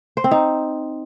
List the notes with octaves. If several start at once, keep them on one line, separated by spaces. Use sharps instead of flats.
C5
C4
D#4